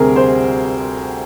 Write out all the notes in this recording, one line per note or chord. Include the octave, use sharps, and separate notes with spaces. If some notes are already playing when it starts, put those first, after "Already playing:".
Already playing: D2 C3 G3 C4 G#4 A#4
C5